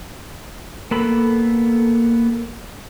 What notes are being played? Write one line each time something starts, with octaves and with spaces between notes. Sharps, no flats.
A#3 B3 A4 B5